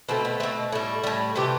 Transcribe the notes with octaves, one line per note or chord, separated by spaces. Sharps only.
B2 A3 C4
B3
B2 A3 C4
A2 G3 E4
A2 G3
C3 E3 A3 G4